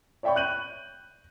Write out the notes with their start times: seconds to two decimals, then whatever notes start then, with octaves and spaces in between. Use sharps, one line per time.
0.23 C#5 D5 E5 G5 B5 C#6
0.36 F#6 G6 D#7 F#7